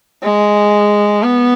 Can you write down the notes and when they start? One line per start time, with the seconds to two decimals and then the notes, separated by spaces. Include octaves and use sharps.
0.23 G#3
1.23 B3